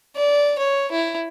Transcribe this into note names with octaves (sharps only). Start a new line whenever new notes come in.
D5
C#5
E4